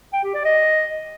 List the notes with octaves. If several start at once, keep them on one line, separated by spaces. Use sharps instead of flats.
G5
G4
D5
D#5